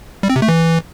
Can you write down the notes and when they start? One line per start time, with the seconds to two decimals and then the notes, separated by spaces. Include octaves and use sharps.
0.23 G3
0.30 C4
0.36 C3
0.42 A3
0.48 E3